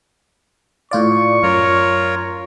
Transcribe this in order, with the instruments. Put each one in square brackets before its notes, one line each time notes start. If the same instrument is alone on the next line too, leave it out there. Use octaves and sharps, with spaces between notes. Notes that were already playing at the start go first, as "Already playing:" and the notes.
[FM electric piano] A2 F4 D5 [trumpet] C#6
[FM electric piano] F#2 [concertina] F4 A#4 C#5